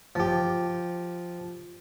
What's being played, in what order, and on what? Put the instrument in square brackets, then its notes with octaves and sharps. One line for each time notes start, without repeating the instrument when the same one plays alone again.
[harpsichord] F3 G4